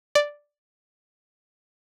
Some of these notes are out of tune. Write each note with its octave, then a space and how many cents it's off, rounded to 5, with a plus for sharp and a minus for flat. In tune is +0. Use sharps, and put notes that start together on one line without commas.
D5 +0